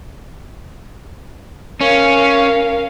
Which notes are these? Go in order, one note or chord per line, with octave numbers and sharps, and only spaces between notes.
C#4 A#4 F5